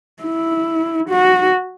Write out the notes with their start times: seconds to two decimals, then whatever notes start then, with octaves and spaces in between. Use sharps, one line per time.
0.23 E4
1.09 F#4